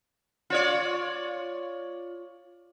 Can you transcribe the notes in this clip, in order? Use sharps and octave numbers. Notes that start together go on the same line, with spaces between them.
F4 C#5 D5